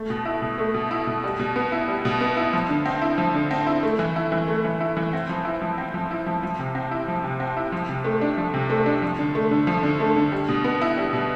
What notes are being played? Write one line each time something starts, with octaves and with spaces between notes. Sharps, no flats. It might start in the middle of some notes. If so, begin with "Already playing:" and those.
Already playing: A3
B2
E4
B2
A3
B2
E4
B2
G3
B2
B3
E4
G3
B2
B3
E4
F3
D3
C4
E4
F3
D3
C4
E4
A3
E3
E4
E3
A3
E3
E4
E3
C4
F3
E4
F3
C4
F3
E4
F3
F3
C3
C4
E4
F3
C3
C4
E4
F3
C3
A3
D4
F3
C3
A3
D4
F3
D3
A3
D3
F3
D3
A3
D3
G3
B2
B3
E4
G3
B2